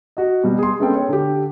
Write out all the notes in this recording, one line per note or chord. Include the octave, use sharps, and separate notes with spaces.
F#4 D#5
B2 G3
G#4 C6
G#3 B3 C#4 A4 G5
C#5
D3 G4